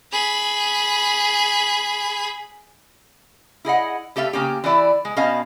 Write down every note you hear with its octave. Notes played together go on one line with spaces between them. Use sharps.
G#4 B5
E4 G#4 D#5 F#5
A3 G4 A4 E5 F5
C#3 A#3 C#4 G4
E3 E4 D5 E5
G#3
B2 C#4 D#5 F5 A5